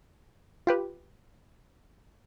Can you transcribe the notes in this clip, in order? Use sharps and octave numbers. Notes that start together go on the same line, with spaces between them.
F4 G4 B4